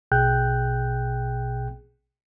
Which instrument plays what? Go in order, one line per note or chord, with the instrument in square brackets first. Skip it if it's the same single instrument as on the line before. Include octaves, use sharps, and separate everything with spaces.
[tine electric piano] A#1 B2 G#4 G5 F#6 G6